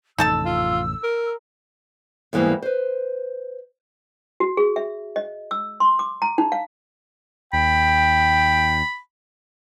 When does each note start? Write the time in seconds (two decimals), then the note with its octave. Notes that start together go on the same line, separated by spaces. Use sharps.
0.18 A1 F2 C3 D#4 A4 A5 E6
0.45 F4
1.03 A#4
2.33 E2 G#2 E3 G3 A#3
2.62 B4 C5
4.40 F#4
4.57 G#4
4.76 E5
5.16 D#5
5.51 E6
5.80 C6
5.99 D6
6.22 A#5
6.38 D#4
6.52 F5
7.53 D#2 G5 B5